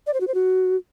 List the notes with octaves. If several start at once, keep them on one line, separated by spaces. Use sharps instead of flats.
D5
C5
F#4
C5
F#4